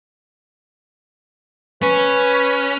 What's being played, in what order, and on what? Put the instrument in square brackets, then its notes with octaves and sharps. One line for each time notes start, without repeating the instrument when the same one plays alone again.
[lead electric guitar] C#4 [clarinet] B4